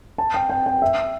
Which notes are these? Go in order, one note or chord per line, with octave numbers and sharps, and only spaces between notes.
A5
G5
G5
G5
E5